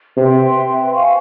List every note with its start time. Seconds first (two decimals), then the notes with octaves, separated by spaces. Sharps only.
0.17 C3 B4 E5 G5 C6
0.94 C5 F5 G#5 C#6